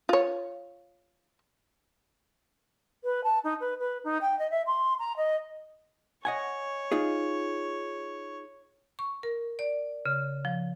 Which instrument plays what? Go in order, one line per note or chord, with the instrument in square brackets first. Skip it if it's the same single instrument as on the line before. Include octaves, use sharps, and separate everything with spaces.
[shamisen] F4 C#5
[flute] B4
A5
D#4
B4
B4
D#4
G5
D#5
E5
C6
A#5
D#5
[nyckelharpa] C#5 [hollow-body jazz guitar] D#5 F#5 G#5
[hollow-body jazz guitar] D#4 F4 G#4
[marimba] C#6
A#4
D5
C#3
F3